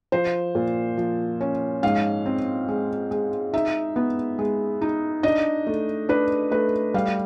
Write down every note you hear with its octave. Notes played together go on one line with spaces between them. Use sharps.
F3 C5
A#2
F3
C#4
G#2 F5
C4
G#3
G#3
D#4 E5
B3
G#3
D#4
D4 D#5
A3
D4 B4
A3 B4
G3 F5